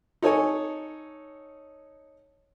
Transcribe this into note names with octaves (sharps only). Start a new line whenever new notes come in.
D#4 A4 C#5 G#5